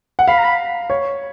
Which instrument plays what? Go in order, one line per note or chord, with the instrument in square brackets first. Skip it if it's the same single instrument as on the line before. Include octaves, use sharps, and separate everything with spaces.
[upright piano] F#5
[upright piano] F5 [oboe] B5
[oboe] A#5
B5
[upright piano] C#5